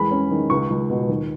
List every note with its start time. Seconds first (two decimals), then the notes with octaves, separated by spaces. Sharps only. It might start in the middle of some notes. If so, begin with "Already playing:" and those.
Already playing: E2 G#3 B5
0.11 C#4
0.31 D#3
0.50 C#2 C#6
0.70 C#2
0.90 B2
1.09 D#2